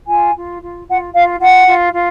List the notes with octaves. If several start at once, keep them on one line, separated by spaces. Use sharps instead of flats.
F4 G#5
F4
F4
F4 F#5
F4 F5
F4 F#5
F4
F4